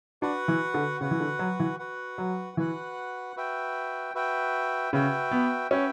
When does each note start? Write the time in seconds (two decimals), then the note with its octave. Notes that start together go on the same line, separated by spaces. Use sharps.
0.22 D4 F#4 B4 F#5
0.48 E3
0.74 D3
1.01 C#3 F#4 B4 F#5
1.11 E3
1.20 D3
1.39 F#3
1.60 E3
1.79 F#4 B4 F#5
2.18 F#3
2.57 E3 F#4 B4 F#5
3.36 F#4 B4 E5 G5
4.14 F#4 B4 E5 G5
4.92 C#3 F#4 B4 E5 G5
5.31 B3
5.71 C#4 F#4 B4 E5 G5